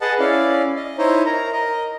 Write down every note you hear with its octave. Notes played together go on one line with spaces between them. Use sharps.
G#4 B4 D#5 F#5 A5
C#4 E4 D5 F5
D#5
D#4 E4 C5 C#5 D#5
A#4 A#5
A#4 D#5